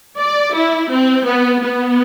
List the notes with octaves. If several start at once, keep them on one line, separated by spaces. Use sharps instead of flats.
D5
E4
C4
B3
B3